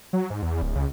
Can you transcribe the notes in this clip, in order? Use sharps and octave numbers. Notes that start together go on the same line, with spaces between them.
F#3
G#2
E2
D1
C#2